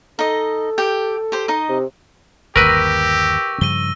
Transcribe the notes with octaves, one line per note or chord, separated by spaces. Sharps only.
D#4 A4 D#5
G4 G5
G4 C5
D#4 D#5
C3
G1 D#2 G4 A#4 B4 C#6 E6 A#6
G2 C#3 F3 D#7 G7